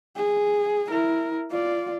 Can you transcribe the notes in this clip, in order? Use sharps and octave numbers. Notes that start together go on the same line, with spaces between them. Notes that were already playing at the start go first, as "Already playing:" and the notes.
G#4
E4 A#4
F4 D5